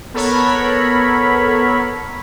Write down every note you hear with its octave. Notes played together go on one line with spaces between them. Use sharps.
B3 A4 A#4 C#5 B5